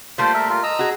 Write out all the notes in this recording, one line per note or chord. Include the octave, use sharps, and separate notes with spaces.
G3 A3 A#3 F4 C5
A#4 E5
F4 A#4
D#5 A#5 E6
F#4 G#4